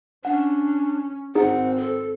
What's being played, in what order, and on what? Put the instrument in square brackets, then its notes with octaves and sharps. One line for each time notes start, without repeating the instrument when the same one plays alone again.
[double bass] C#4 [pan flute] D4 [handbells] F#5
[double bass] G#1 C4 [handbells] D#4 G#4 [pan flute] F#5
[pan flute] A4